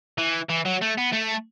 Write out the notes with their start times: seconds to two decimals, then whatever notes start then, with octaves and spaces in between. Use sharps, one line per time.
0.18 E3
0.50 E3
0.66 F#3
0.82 A3
0.98 B3
1.13 A3